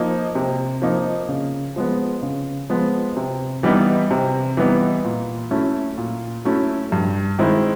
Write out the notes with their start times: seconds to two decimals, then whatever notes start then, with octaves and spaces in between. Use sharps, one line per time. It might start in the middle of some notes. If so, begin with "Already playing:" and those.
Already playing: F3 A#3 D#4
0.35 C3
0.82 F3 A#3 D#4
1.29 C#3
1.76 F3 G#3 B3
2.22 C#3
2.70 F3 G#3 B3
3.17 C3
3.63 E3 G3 B3 D#4
4.11 C3
4.57 E3 G3 B3 D#4
5.05 A#2
5.51 F#3 A3 C#4 E4
5.98 A#2
6.45 F#3 A3 C#4 E4
6.92 G2
7.39 D#3 G#3 C4 E4